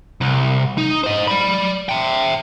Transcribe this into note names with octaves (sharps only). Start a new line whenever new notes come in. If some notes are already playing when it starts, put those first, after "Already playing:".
C2
D#4
C5 D#5
D5 B5
E5 G5